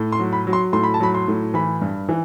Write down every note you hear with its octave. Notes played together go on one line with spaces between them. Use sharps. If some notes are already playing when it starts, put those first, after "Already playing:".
Already playing: A2
C6
F#3
B5
F#3
C6
A2 C6
B5
A5
F#3 B5
C6
A2
E3 B5
G2
E3